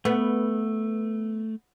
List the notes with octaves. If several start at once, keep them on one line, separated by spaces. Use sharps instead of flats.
A3 B3